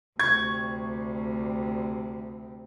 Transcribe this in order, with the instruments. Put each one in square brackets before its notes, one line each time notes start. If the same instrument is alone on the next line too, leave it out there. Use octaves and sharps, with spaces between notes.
[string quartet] D2 C3 G3 [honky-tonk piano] C#6 G#6